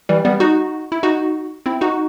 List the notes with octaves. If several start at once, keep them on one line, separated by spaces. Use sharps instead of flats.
E3 G3
G3 B3
D#4 F#4
E4
D#4 F#4
C4 E4
D#4 F#4